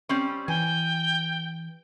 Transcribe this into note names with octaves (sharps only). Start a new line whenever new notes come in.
G3 C4 C#4
E3 G5 G#5